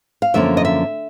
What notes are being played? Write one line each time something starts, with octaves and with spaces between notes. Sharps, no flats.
F5
F#2 D3 F3 A#3 C#4 E5
D#5
E5